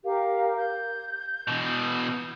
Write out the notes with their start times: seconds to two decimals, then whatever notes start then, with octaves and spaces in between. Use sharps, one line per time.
0.04 G4 A#4 F5
0.58 G6
1.48 B2 E3